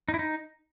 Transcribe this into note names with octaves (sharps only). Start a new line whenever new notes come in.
D#4
E4
D#4